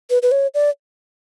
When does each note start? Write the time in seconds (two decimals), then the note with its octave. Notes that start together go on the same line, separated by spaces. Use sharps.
0.10 B4
0.22 B4
0.32 C#5
0.54 D5